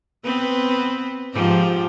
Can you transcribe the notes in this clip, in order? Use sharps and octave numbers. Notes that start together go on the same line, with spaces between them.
B3 C4 B4
G#2 F3 G4